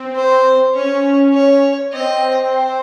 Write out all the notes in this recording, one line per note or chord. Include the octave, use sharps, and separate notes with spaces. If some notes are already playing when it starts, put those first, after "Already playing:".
Already playing: C4
C5
C#4 C#5
C#5
C4 D#5
C5